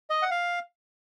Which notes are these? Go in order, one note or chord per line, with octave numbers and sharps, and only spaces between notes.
D#5
F#5
F5